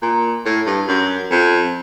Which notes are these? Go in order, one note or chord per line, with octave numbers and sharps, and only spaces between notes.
A#2
A2
G2
F#2
F2